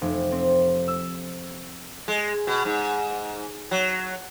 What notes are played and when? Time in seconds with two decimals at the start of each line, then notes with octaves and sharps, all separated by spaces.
0.02 F1
0.32 C4
0.88 E6
2.08 G#3
2.47 B2
2.65 G#2
3.71 F#3